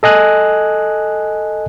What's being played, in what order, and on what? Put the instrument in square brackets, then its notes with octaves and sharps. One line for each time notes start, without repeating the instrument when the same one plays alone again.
[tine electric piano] A4 D#5 G#5 F#6